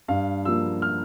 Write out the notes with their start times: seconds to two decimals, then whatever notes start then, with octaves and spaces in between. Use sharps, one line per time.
0.08 G2 F5
0.45 F3 A#3 E6
0.82 F6